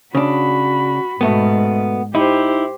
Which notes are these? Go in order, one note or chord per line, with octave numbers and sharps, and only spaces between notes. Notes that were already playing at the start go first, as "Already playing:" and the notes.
C#3 D4 F#4 B5
G#2 B2 A3 B3
D#4 E4 G4 C5